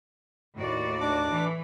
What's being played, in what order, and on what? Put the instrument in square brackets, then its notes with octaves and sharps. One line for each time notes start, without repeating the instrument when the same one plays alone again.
[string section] D#2 [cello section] A2 F#4 D5
[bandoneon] D4 D6
[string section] E3